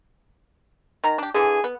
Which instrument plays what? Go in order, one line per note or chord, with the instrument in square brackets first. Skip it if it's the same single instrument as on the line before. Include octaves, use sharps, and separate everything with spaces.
[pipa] D#3 A#5
D4 G4
[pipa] D3 E3 [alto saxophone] G#4
[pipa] B3